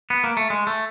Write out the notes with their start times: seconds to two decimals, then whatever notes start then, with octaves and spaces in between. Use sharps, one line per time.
0.10 B3
0.24 A#3
0.37 A3
0.50 G#3
0.67 A3